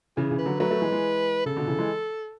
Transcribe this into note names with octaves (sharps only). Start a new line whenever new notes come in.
C#3 E3 G#4
C#3 E3
B4
D3 F#3
F#3 A3 B4
F#3 A3
E3 G#3
E3 G#3
C#3 A4
B2 D3
C#3 E3
E3 G#3